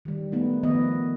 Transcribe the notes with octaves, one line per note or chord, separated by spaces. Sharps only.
D#3 G3
A3 B3 D#4
D#3 F3 B3 D#5